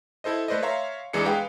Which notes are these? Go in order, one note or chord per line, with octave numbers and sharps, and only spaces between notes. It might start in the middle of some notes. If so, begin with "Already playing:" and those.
E4 A4 C5 D#5
A3 B4 C5 D5 D#5
C#5 E5 F5 A#5 C6
E2 E3 G#3 D4 C#7
G#3 B4 F5 G5